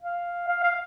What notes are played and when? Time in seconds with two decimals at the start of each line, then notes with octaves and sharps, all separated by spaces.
0.02 F5
0.48 F5
0.63 F5